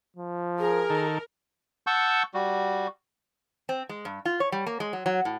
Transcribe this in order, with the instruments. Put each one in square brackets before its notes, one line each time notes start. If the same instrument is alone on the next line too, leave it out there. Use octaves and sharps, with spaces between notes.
[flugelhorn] F3
[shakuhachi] G#4 [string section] A#4
[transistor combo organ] D#3 A4
[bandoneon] F#5 A5 C#6 E6 G6
G3 F#4
[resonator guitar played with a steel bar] C4
G#3
G2
F4
C#5
G3
A#3
G#3
F#3
F#3
A2